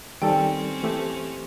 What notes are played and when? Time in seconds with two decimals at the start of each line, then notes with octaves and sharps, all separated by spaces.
0.22 D#3 G3 C4 C#4 A4 G5
0.83 E3 A3 G4